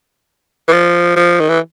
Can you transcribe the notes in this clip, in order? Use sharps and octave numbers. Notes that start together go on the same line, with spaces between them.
E3
F3
F3
D#3
E3